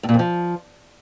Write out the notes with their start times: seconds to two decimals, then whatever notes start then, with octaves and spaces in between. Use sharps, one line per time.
0.03 A2
0.09 A#2
0.14 F2
0.19 F3